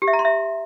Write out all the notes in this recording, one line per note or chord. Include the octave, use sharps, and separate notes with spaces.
G4
E5
A#5
C6
E5